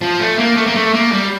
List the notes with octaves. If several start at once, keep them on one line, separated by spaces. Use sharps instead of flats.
F3
A3
A#3
A3
A#3
A3
A#3
G3